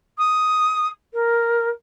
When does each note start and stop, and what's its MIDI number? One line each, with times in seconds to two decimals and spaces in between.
0.18 0.87 87
1.13 1.68 70